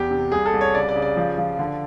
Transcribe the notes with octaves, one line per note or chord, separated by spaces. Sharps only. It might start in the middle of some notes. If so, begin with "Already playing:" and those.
Already playing: E2 G4
C3
C2 G#4
A4
C2
C#5
C#3 D5
D5
C#3
D5
F3
F3
D3